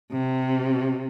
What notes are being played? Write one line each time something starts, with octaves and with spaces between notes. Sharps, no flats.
C3